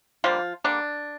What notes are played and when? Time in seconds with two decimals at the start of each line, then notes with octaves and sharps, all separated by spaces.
0.24 D3 F3 G3 A#3 F4
0.64 D3 G3 A#3 D4